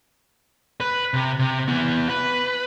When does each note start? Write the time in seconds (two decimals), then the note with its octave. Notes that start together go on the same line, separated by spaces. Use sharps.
0.80 B4
1.14 C3
1.39 C3
1.68 B3 E4
2.09 B4